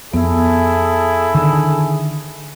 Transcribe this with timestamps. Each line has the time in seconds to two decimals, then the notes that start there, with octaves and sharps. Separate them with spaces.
0.13 F2 B3 E4 G#4 A4
1.35 D3 D#3